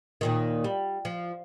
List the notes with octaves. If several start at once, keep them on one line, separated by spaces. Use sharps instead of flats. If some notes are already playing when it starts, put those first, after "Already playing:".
D#2 A#2 D#3
G3
F3